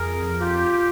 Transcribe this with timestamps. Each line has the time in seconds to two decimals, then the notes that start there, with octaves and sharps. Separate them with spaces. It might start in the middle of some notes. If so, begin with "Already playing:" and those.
Already playing: F2 G#4 A#4
0.40 F4 G4